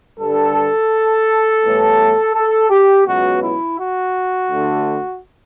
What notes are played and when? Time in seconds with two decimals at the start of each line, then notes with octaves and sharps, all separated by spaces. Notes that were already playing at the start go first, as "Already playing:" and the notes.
0.20 G2 D3 G3 A4
1.63 A2 E3 G3 B3
2.35 A4
2.70 G4
3.06 C#2 B2 F#3 B3 F#4
3.42 E4
3.78 F#4
4.50 D2 D3 A3